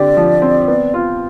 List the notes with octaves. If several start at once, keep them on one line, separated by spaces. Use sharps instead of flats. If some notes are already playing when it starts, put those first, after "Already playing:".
Already playing: D3 C4 G4 D5
F3
C4
B3
F4